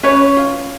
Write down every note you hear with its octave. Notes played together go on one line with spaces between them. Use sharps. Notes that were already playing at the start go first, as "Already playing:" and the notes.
C#4 B4 C#5
F4